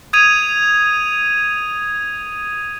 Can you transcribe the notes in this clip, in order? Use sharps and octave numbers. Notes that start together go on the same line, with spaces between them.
D#6 G#6 D#7 F7